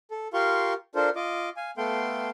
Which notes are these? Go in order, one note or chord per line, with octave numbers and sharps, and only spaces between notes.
A4
F4 G4 A#4 F5 C6 C#6
D4 F4 A4 A#4 C5
F4 D#5 D6
F5 G#5
A3 B3 A4 F5 G5 C6